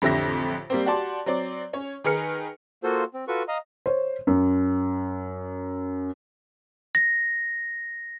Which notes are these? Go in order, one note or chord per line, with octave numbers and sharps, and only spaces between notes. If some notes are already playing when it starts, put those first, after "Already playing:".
A1 F2 D3 G4 E5 A#6
G3 A#3 C4
F#4 G4 D5 F#5 A5 C6
F#3 C4 D5
C#4 C#5
D#3 D#4 G#4 B4 F6 C#7
A#3 F4 F#4 A4 C5
C4
F4 F#4 A4 B4 C#6
D#5 F5 A#5 D#6
C5 C#5
F#2
A#6